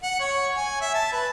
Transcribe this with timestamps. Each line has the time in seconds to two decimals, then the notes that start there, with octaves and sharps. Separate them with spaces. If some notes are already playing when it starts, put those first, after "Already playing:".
0.03 F#5
0.20 C#5
0.56 G#5
0.82 E5
0.94 A5
1.12 B4